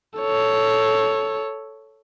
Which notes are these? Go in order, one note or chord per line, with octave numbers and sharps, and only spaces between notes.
A4 C#5